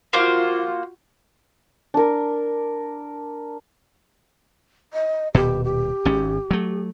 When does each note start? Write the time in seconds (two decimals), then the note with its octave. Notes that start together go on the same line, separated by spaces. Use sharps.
0.13 A#3 F4 F#4 C5 F5
1.94 D4 A#4
4.93 D#5
5.34 D#1 B2 G4
5.64 G4
6.05 G#1 G#2 C#4
6.51 F#3 A3